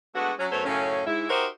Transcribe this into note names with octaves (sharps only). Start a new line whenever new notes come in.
G#3 A3 B3 D4 F#4
F#3 C#4
F#2 A3 B3 C5 C#5
F#2 A2 C#3 C#4
G#2 E4
D#4 F#4 G4 A#4 C5 E5